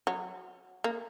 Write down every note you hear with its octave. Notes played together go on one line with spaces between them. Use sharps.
F#3
A#3